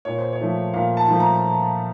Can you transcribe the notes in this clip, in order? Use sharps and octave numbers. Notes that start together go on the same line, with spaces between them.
A#2 C#5
C5
C#5
F3 A3
A#2 F5
A5
F3 A3
A#5